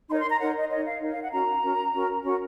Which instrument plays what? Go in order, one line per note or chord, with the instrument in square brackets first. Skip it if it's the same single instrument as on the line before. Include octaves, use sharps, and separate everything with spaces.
[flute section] D#4 A#4 C#5 C6
C6
A#5
D#4 A#4 C#5 F#5
D#5
D#4 A#4 C#5 D#5
F5
D#4 A#4 C#5
F5
F#5
C#4 F#4 A#4 A#5
C#4 F#4 A#4
C#4 F#4 A#4
C#4 F#4 A#4